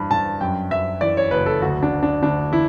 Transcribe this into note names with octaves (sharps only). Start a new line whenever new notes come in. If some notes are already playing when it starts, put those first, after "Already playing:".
Already playing: G2 E3 B5
G2 A5
F#2 G5
F#2 E5
E3 D5
C#5
F#1 B4
A4
D2 F#4
D4
D2
D4
D2 D4
E3 E4